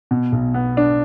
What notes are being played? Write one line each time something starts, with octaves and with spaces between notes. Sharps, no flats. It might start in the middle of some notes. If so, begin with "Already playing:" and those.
B2
B1
B3
D4